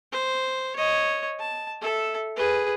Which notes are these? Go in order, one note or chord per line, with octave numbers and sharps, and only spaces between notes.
C5
C#5 D#5
A5
A4 E5
G#4 B4